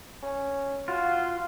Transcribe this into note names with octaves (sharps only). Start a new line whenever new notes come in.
C#4
F4 F#4